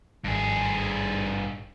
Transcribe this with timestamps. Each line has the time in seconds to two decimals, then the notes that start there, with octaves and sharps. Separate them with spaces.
0.24 G#1 G2 G#4